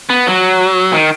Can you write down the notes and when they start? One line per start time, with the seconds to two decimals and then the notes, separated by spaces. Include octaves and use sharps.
0.10 B3
0.27 F#3
0.93 D#3